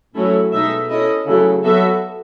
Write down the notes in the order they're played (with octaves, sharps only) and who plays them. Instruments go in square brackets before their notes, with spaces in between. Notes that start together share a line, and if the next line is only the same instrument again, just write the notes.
[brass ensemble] A2 [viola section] F#3 A3 C#4 E4 A4
[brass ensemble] B2 [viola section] G#3 D#4 A4 E5
[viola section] C#4 E4 A4 D#5
[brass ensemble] C#3 [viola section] F#3 A3 E4 A4
[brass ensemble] F#3 [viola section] B3 F#4 A4 E5